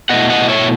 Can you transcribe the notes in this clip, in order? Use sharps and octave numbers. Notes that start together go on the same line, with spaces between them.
B2 A3 E4 D#5 F#5
D#5 F#5
C#5 E5